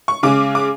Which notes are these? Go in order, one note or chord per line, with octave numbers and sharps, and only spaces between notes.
C#6
C#3 G#3 C#4 D6
D6